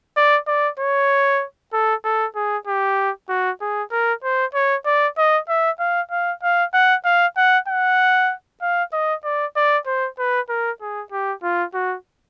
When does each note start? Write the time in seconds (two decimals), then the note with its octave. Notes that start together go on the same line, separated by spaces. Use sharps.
0.17 D5
0.47 D5
0.80 C#5
1.73 A4
2.04 A4
2.36 G#4
2.67 G4
3.29 F#4
3.61 G#4
3.92 A#4
4.24 C5
4.54 C#5
4.86 D5
5.18 D#5
5.49 E5
5.80 F5
6.11 F5
6.43 F5
6.74 F#5
7.05 F5
7.37 F#5
7.68 F#5
8.62 F5
8.93 D#5
9.24 D5
9.56 D5
9.87 C5
10.19 B4
10.49 A#4
10.81 G#4
11.12 G4
11.43 F4
11.74 F#4